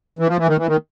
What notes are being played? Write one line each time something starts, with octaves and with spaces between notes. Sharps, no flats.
E3
F3
E3
D#3
E3
D#3